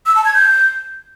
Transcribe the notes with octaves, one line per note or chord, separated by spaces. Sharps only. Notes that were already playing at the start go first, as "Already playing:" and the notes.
E6
A5
G#6
G6